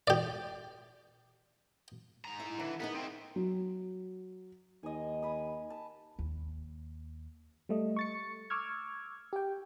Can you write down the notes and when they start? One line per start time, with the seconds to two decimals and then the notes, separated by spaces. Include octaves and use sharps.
0.08 G4 D5
2.25 G#2 A#5
2.40 E4
2.59 D3 E3
2.80 B3 D#4 G#4 A#4
2.94 C4 E4
3.36 F#3
4.83 D#2 D#5 G#5
5.22 G#5 B5 D#6
5.70 A5
6.19 D#2
7.69 G3 A3 D#5
7.96 C#6 A6 C#7
8.50 C#6 D6 E6 F6 G#6
9.33 G4 G5